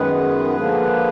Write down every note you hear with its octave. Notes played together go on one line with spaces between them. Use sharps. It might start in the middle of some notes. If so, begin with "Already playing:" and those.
Already playing: F#2 D#3 G#3 B3 G#4 B4
D3 F3 A#3